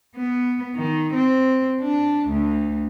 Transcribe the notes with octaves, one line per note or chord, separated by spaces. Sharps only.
B3
D#3
C4
D4
D2